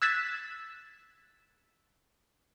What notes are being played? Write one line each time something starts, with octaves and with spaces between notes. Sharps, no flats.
E6 F#6 G#6 A6 B6 E7